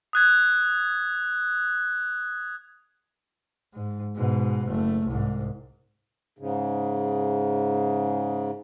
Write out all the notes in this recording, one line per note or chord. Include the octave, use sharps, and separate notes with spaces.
D#6 F#6 G#6
G#2
G#2 B2
F#1 A3
C2 G#2
G#2 C#3